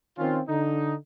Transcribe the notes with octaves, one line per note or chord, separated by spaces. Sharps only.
D#3 C4 C#4 F4
D3 D#4